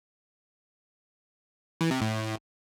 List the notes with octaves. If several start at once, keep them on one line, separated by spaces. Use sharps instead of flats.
E3
C3
A2